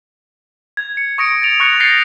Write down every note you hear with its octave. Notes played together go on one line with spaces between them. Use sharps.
G#6
C#7
C#6 D#6 A#6 C#7 D7
A6 D7 F7
C#6 D#6 F#6 A#6 C#7 F7
G6 A6 A#6 C7 C#7 G7